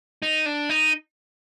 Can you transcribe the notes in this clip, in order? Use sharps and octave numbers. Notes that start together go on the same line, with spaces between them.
D#4
D4
D#4